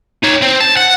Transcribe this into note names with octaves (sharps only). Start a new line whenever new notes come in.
D#4 C#5
C4
A5
F#5